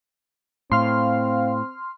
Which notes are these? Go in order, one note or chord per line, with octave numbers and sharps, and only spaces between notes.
A2 C4 F5 C6 F6